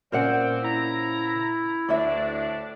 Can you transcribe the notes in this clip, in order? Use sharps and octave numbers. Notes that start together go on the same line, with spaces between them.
A#2 C#3 C4 C#4 A#4 C5 D5 F#5
E4 E5 A#5
D2 A2 D4 D5 E5